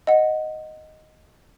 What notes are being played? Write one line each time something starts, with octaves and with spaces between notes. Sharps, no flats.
D#5 F#5